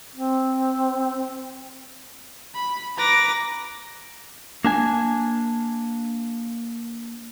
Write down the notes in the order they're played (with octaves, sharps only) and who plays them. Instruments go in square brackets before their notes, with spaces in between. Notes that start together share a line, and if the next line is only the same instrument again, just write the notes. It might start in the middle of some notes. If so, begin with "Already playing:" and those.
[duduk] C4
[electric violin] B5
[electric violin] B4 A#6 [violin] A#5 D6
[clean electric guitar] A#3 D4 G#5